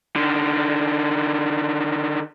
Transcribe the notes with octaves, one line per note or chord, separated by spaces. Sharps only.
D3 D#3